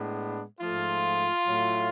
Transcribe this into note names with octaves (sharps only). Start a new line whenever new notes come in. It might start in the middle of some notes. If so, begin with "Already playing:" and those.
Already playing: A2 G#3 B3 D4
G#2 F3 A3 F4
A2 F#3 A3